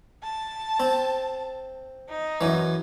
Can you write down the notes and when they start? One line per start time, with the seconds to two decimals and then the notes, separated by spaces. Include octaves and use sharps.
0.23 A5
0.80 C4
2.09 D#4
2.41 F#2 E3